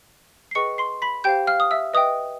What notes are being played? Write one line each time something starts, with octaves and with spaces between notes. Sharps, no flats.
C7
G#4 B4 D#5 G5 C#6 C#7
C6 C7
B5 B6
G4 C5 F5 G5 G6
F5 F6
D#6
E5 E6
B4 D#5 E5 G5 D#6